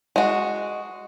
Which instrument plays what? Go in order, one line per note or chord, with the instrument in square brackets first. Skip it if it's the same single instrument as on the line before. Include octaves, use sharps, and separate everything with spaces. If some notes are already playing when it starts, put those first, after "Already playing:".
[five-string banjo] G#3 F#4